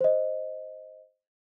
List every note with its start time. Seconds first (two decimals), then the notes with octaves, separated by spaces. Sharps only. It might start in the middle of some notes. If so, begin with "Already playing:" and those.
0.01 C5 D#5